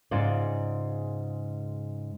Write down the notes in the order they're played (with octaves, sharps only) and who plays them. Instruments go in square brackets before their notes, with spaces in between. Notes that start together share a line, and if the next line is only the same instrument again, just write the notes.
[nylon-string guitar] G#2 C#3 F4 D5